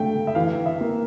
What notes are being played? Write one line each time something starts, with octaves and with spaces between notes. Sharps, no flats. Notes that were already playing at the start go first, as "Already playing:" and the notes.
Already playing: D3 A3 G5
E5
E3 F5
E5
A#3